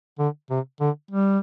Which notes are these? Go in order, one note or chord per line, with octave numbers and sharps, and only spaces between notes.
D3
C3
D3
G3